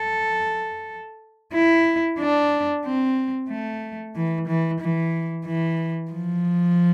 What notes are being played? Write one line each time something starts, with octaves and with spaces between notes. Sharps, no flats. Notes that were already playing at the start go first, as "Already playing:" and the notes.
Already playing: A4
E4
D4
C4
A3
E3
E3
E3
E3
F3